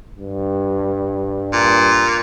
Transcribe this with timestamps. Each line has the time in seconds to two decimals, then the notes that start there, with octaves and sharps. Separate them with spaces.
0.17 G2
1.53 A#2